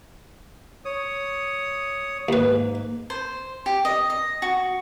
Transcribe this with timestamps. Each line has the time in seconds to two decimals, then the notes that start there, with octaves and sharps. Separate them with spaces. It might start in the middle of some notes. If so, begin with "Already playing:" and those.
0.85 C#5 D#6
2.29 D#2 G#2 A#3 B4
3.10 C5
3.66 G4
3.85 D#5
4.10 D#5
4.42 F#4